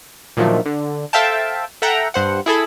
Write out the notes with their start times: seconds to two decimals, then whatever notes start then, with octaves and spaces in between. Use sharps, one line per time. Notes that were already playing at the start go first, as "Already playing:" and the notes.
0.37 A#2 D3 D#3 F3 F#3 A3
0.66 D3
1.13 A4 C5 E5 F5 G5 A5
1.82 A4 E5 F#5 G5 A#5
2.14 G2 C5 F#5
2.46 E4 G#4 A4 B5